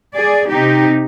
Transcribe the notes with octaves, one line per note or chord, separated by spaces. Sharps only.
G#4 D5
C3 D#4 G4